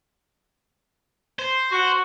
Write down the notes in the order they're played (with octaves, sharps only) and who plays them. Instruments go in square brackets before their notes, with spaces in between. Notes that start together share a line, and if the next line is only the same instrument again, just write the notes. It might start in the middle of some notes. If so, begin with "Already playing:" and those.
[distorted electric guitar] C5
[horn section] F#4